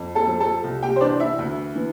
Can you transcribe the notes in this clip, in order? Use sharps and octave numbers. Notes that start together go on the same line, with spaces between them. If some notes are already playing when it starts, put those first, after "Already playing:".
Already playing: F2
A4 A5
F3
A4 A5
C2
G4 G5
C5
E3 D4 D5
E4 E5
D2
E3